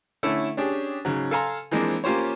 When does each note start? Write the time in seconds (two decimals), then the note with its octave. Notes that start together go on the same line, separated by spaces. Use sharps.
0.23 D3 A3 C#4 E4 A4
0.57 C#4 D4 G4 G#4
1.05 G#2 C#3 F#3
1.31 A4 F5 G#5 A#5 C6
1.71 E3 F3 G#3 A#3 C4 D4
2.04 A#3 C#4 F4 G4 C5 C#5